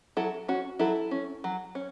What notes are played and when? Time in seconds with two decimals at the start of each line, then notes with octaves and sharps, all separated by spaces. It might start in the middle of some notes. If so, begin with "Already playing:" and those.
0.17 F#3 E4 A4
0.48 C#4 F#4
0.79 F#3 E4 A4
1.11 C#4
1.44 F#3
1.75 C#4